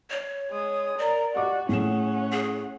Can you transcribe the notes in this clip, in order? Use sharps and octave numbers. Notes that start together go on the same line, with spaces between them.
C#5
G#3 D#6
A#4 D5
F#4 G4 D#5 D6
A2 C#4 G#4 F#5 E7
G#4